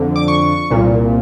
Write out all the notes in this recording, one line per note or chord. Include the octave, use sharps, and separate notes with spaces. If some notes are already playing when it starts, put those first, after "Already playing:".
Already playing: F2 D3
D6
C#6
C2 A#2